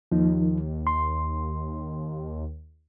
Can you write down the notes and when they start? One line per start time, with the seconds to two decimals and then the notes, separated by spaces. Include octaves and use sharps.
0.12 D#2 F3 D#4
0.87 C6